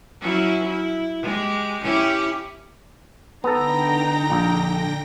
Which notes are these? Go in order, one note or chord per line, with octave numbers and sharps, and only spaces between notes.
F#3 C#4 E4
E4
G#3 G4
C#4 E4 G4
D3 B3 D#4 A4 G5 A#5 A#6
A#1